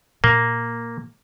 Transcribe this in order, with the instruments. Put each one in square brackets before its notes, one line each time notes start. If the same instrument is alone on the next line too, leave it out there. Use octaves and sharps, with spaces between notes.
[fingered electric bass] A#2 [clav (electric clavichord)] A#3